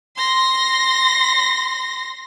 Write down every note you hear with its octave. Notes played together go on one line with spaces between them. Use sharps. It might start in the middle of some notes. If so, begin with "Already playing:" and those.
C6 A#6